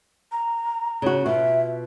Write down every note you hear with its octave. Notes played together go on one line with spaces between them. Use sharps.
A#5
C#3 F#4
B2 F4 E5